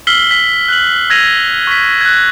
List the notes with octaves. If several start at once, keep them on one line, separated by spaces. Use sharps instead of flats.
E6 F6 B6 C7 F#7 G7
B6
F#6 F#7
E6 G#6 A#6 C7 D#7 F7
C#6 B6
F#6 G#6